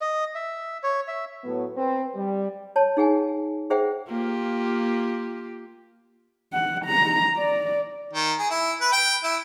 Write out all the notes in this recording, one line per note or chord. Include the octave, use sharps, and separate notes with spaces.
D#5
E5
C#5
E5
A2 F#3 B3
C4 B4
G3
C#5 A5
D#4 G#4 F#5 G#5
G#4 C5 E5 F#5 G5
A#3 F4 G4
F#5
A#5
D5
D#3
G#4
E4
B4
G5
E4